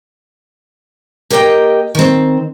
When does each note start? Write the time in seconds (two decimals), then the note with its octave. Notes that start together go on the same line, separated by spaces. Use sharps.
1.30 A#3 G4 A#4 D#5 F#5 G5
1.95 D#3 C4